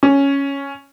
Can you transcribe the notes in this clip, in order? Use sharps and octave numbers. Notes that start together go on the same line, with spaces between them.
C#4